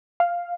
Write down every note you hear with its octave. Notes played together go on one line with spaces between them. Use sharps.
F5